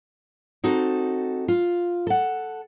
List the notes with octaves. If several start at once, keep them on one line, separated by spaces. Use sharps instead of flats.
C4 D#4 F#4 A4
F4
A4 F#5